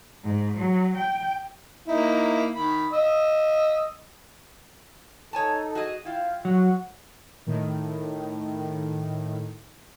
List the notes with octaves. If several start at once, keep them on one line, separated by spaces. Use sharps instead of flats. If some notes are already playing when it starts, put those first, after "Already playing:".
G#2
F#3
G5
A#3 D#4 E4
D#3 B5
D#5 E6
D#4 A4 C#5 G#5 A5
F#4 G#4 D#5
E4 F4 F5 G5
F#3 F#4 F#5
A2 D#3